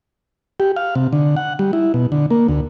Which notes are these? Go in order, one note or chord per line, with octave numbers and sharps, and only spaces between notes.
G4
F5
C3
D3
F#5
G3
E4
B2
D3
A#3
D2